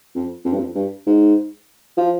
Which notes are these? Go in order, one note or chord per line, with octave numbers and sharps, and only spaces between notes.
F2
F2
G2
F2
G2
G#2
F3